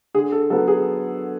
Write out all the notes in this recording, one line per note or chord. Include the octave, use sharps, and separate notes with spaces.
D3 G#4
A4
F#3 B3 A4
G#4